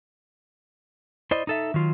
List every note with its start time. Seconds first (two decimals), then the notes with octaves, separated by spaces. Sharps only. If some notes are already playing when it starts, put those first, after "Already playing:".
1.31 E4 C5 D5 D#5
1.47 D#4 A4 E5
1.74 D#3 F#3 F4